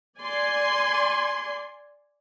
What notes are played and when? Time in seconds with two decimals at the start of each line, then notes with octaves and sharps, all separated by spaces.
0.19 D5 G#5 C6